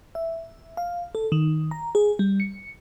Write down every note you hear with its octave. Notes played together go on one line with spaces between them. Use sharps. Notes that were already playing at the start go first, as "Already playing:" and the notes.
E5
F5
A4
D#3
A#5
G#4
G3
C#7